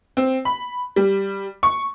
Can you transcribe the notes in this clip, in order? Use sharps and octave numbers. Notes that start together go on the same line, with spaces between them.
C4
B5
G3
C#6